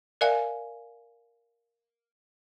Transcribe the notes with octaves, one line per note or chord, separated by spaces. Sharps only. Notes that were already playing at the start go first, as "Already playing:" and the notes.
A#4 D5 E5 F5 G#5